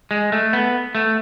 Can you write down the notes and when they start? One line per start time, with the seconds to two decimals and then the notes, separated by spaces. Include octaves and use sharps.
0.11 G#3
0.32 A3
0.53 B3
0.95 A3